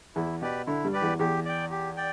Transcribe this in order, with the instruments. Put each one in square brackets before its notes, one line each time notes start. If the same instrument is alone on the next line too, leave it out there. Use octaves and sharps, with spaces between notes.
[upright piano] E2 E3 [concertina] E4
[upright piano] B2 [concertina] G4 B4 D5
[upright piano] D3 [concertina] E4
[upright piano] G2 G3
[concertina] G4 B4 D5
[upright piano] E2 E3
[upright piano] E2 E3 [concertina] G4
[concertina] D5 G5
G4
D5 G5